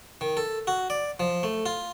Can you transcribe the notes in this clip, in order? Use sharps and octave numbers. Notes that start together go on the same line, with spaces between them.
D#3
A4
F#4
D5
F3
A3
F4